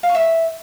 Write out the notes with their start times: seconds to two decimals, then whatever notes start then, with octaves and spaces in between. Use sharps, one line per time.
0.03 F5
0.09 C#6
0.14 E5